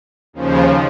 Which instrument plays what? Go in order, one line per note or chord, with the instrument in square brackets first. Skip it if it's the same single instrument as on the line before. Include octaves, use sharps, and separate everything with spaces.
[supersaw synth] D#2 C#3 F3